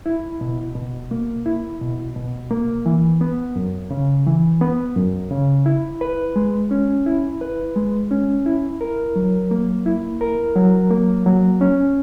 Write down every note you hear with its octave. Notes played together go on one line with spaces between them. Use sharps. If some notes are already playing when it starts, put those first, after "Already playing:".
E4
B2
B2
A#3
E4
B2
B2
A#3
E3
B3
F#2
C#3
E3
B3
F#2
C#3
E4
B4
G#3
C#4
E4
B4
G#3
C#4
E4
A#4
F#3
A#3
E4
A#4
F#3
A#3
F#3
C#4